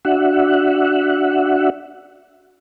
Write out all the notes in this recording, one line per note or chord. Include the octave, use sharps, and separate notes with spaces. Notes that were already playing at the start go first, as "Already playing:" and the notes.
D4 F#4 E5 F#5